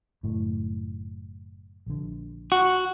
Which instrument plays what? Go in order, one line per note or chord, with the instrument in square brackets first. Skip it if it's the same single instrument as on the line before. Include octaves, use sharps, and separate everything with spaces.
[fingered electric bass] F#1 A2
A#1 D3
[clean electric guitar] F#4